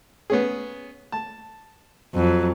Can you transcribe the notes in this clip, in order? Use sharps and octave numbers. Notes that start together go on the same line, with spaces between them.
B3 C#4 G#4
A5
F2 F#3